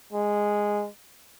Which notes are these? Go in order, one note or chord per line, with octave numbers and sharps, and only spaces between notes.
G#3